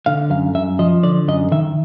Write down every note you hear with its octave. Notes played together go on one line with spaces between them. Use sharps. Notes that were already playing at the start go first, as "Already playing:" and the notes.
D3 F5
F#2 F5
F#2 E5
F3 D#5
D3 D5
F#2 D#5
D#3 E5